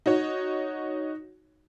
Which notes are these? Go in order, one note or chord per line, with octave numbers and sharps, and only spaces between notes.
D#4 F#4 C#5